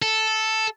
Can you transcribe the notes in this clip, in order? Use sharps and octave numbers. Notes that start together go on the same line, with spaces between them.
A4